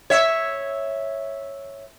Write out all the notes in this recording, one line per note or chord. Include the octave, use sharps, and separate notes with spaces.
C#5 E5